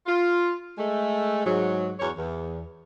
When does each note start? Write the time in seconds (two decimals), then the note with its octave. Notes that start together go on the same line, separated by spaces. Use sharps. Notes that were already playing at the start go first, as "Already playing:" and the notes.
0.06 F4
0.78 G#3 A3
1.45 G#2 F#3
1.99 E2 F#4 C#5
2.17 E2